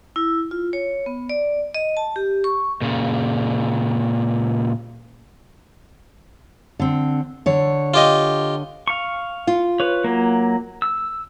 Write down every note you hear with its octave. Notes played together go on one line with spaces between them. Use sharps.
E4
F4
C#5
B3
D5
D#5
A5
G4
C#6
A#2 C#3
D3 C4
D3 C#5
F4 G4 D#5
F5 C#6
F4
B4 C#5
F#3 A#3
E6